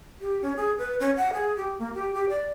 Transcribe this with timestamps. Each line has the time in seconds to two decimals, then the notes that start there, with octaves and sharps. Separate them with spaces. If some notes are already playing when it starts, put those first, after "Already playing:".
0.21 G4
0.42 C#4
0.57 G#4
0.78 B4
1.00 C#4
1.17 F#5
1.33 G#4
1.57 G4
1.79 A#3
1.94 G4
2.14 G4
2.30 D5